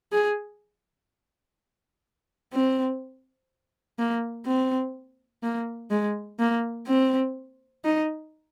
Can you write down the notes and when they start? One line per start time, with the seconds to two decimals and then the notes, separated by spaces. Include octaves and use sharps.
0.12 G#4
2.53 C4
3.99 A#3
4.46 C4
5.43 A#3
5.91 G#3
6.39 A#3
6.87 C4
7.85 D#4